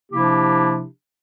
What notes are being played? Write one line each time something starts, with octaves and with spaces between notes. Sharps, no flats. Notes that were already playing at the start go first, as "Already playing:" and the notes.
C3 F3 A#3 D4 E4 G4